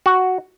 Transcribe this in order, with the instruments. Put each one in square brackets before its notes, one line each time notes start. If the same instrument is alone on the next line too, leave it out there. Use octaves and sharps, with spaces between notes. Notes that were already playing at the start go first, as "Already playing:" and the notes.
[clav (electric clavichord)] F#4